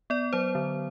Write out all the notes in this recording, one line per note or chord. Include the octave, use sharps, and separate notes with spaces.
B3 D5
F#3 C5
D3